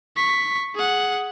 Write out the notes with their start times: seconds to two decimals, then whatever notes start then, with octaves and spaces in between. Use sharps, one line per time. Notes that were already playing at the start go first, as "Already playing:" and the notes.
0.17 C#6 B6
0.75 G#4 F#5